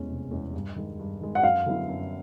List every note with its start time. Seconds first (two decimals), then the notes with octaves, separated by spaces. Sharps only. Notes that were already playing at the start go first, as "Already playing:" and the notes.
Already playing: E2 B2 G#3 C#4
0.09 F1
0.31 E2 B2 G#3 C#4
0.54 G2
0.76 D#3 G#3
0.99 G2
1.20 D#3 G#3
1.35 F#5
1.43 F#2 F5
1.66 D3 F#3 B3 E4
1.89 F#2